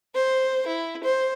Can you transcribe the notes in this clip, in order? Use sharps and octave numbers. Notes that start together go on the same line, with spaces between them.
C5
E4
C5